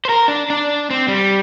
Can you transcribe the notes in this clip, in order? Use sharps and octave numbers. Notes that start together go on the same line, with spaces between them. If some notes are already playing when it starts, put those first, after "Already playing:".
A#4 C5
D4
D4
C4
G3